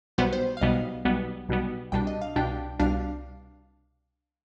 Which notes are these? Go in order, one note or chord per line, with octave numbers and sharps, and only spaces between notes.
B1 B2 G3 B3 C5
C5
F5
B1 B2 G3 B3 D#5
B1 B2 G3 B3
B1 B2 G3 B3
C2 B2 G3 D4 G5
D#5
F5
C2 B2 G3 D4 G5
C2 B2 G3 D4 F5